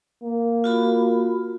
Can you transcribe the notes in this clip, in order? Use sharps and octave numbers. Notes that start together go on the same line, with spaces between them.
A#3
F4 F#4 B5